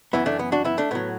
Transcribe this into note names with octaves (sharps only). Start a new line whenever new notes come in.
F#2 E3 B3 E4
A3 D4
B3
D4 F#4
B3 E4
A3 D4
A2 F#3 B3